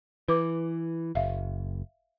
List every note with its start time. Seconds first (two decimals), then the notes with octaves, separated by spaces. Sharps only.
0.28 E3 B4 D6
1.15 F#1 E5 F5